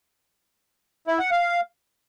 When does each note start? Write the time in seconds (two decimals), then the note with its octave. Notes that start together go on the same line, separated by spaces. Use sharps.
1.07 E4
1.19 F#5
1.31 F5